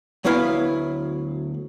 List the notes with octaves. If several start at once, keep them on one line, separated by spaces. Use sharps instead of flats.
D2 F#3 B3 E4 F5 B5